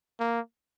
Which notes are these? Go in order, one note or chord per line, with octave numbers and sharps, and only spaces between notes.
A#3